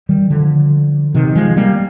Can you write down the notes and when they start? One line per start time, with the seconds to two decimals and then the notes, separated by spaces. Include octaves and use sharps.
0.09 D#3 G3
0.30 D3 F3
1.15 C3 D#3
1.35 F3 G#3
1.56 G3 A#3